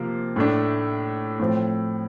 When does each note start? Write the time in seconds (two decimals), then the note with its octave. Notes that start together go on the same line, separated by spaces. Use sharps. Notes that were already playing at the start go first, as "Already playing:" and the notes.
Already playing: C3 F3 A#3 F4
0.36 A2 A3 D4
1.40 A2 F3 C4